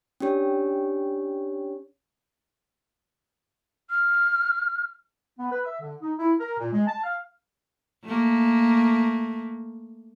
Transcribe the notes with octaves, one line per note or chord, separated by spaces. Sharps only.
C#4 D4 G4 C#5
F6
B3
B4
E5
D3
D#4
E4
A#4
A#2
G#3
A5
F5
A3 A#3